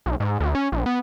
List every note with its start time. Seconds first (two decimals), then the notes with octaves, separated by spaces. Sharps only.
0.06 B1
0.20 G#2
0.40 D2
0.55 C#4
0.72 A#1
0.86 B3